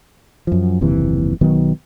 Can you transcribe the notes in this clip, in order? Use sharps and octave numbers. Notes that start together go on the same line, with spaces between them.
F#2 F3
F#1 D#2 C3 E3
B1 D#3 F#3 B3